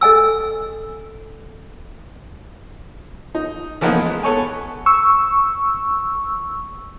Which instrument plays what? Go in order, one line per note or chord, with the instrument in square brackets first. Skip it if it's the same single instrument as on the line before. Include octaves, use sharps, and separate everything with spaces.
[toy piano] A4 D#5 G#5 E6
[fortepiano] D#4
E3 F3 A#3 B3 D#4
G#3
B3 A4 C#5 G#5
[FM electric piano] C#6 E6